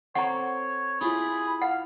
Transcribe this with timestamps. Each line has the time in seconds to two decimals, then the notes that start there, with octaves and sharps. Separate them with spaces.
0.15 C4 A4 C#5 F#5 A#5 D6
1.01 E4 F4 G4 G#4 B5
1.62 F5 F#5